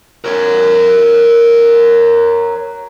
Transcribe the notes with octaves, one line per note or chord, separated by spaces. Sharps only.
A#4 C#5